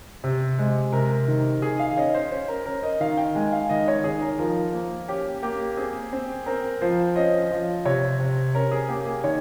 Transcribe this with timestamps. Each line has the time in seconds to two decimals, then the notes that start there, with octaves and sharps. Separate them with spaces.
0.24 C3
0.59 G#3
0.92 C3 A#4
1.28 D#3
1.62 D#3 G#4
1.80 F5
1.97 C#4 D#5
2.14 C5
2.31 C#4 C5
2.48 A#4
2.66 C#4 A#4
2.83 D#5
3.00 D#3 F5
3.17 G5
3.35 G#3 G#5
3.52 F5
3.69 D#3 D#5
3.88 C#5
4.04 D#3 G#4
4.22 A#4
4.39 F3 A#4
4.73 A#3
5.08 C#4 G4
5.43 A#3 G4
5.77 C4 G#4
6.13 C4
6.46 C4 A#4
6.81 F3 C5
7.16 C#4 D#5
7.51 F3
7.85 C3 C#5
8.20 C3
8.55 C#4 A#4
8.71 G#4
8.89 A#3 G4
9.06 G#4
9.24 D#3 C#5